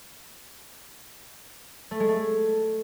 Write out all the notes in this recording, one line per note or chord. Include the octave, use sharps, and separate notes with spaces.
A3
G#3
A3